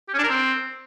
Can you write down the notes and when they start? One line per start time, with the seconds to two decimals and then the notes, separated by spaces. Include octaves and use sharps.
0.08 G4
0.13 C#4
0.18 D4
0.23 A#4
0.28 C4